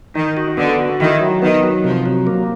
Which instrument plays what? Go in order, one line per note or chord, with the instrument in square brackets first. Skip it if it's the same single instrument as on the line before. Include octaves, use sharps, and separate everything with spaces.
[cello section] D#3 [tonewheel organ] D#4
[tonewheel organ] F#4
[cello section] D3 [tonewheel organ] B3
[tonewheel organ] F#4
[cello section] D#3 [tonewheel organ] E4
[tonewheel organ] F#3
[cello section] D#3 [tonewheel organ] B3
[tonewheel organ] F#3
[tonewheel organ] C3 [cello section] F3
[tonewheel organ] F#3
A#3